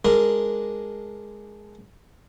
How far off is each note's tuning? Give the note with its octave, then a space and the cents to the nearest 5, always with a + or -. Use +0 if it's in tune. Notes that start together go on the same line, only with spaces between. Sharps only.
G#3 +0 D4 +0 A#4 +0